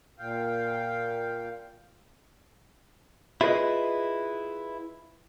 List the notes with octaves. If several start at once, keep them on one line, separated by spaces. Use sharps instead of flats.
A#2 F5 G5
E4 F4 G#4 B4 D#5